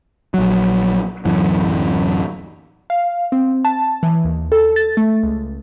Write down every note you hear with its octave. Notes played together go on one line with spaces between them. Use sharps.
A#1 F#3
D1 F#2 E3
F5
C4
A5
E3
D#2
A4
A6
A3
C#2